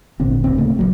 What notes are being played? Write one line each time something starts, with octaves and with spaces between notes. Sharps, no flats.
G#1 A#2 D3 C4
D1 C#2 C4
C#3 A3 A#3
A#1 D#2 F#3